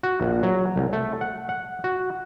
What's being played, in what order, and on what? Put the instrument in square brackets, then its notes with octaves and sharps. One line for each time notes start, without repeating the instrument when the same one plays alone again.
[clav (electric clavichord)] F#4
A#1
F#3
C2
A3
F#5
F#5
F#4